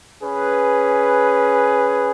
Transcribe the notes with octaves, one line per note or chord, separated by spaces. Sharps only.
C#4 G#4 B4